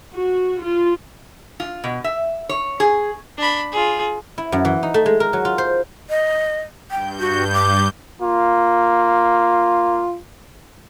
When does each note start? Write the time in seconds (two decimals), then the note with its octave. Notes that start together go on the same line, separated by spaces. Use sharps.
0.15 F#4
0.62 F4
1.60 F4
1.84 B2
2.04 E5
2.49 C#5
2.80 G#4
3.38 D4 B5
3.71 F4 G#4
4.38 E4
4.52 F#2
4.65 E3
4.83 D#4
4.94 A3
5.06 G#3
5.20 A#4
5.33 F#3
5.45 F4
5.58 C5
6.10 D#5
6.91 G2 G5 G6
7.20 F#4
7.54 D6
8.22 A#3 F4